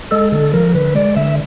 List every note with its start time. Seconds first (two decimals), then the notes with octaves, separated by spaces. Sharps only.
0.11 G#3 A4
0.32 D3 A4
0.53 F3 A#4
0.74 D3 B4
0.95 G#3 D5
1.16 D3 E5